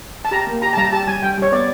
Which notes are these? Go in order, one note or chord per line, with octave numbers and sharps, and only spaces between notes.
A5
G4 A#5
A#3
G4 A#5
A5
G3 A#5
G4 A5
G3 G#5
G3 G5
G3 C#5
B3 D5